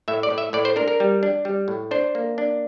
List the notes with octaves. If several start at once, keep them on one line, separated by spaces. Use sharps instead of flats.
A2 E5
D5
A2
E5
A2 D5
C5
D4 A#4
A#4
G3
D4
G3
A2
D4 C5
A#3
D4